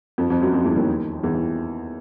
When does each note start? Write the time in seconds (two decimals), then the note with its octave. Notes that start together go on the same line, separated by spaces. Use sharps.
0.18 F2 F3
0.30 F2 F3
0.41 F#2 F#3
0.53 F2 F3
0.65 E2 E3
0.76 D#2 D#3
1.23 E2 E3
1.35 E3